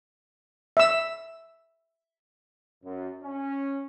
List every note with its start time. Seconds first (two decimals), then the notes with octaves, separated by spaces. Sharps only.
0.77 E5 E6
2.84 F#2
3.23 C#4